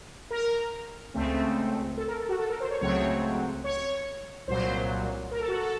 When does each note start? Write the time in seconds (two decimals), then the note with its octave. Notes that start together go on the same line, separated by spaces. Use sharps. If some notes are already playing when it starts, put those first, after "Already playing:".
0.31 A#4
1.14 C#2 C#3 A3 C4
1.97 A4
2.07 A#4
2.18 A4
2.29 F#4
2.39 A4
2.50 A#4
2.60 C5
2.71 C#5
2.81 C#2 C#3 F#3 A3 C4 C#5
3.64 C#5
4.48 C2 A#2 F#3 C5
5.31 A#4
5.40 A4
5.48 F#4
5.57 A4